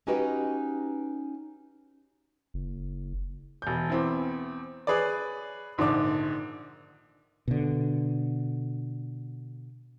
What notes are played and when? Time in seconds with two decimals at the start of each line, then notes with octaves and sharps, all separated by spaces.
0.07 C#4 D#4 F#4 G4 B4 D#5
2.54 F#1
3.62 E1 G6
3.90 E2 C4 E4
4.87 G#4 B4 C#5 D5
5.78 A#1 G#2 D3 D#3 D4 D6
7.48 B2 D3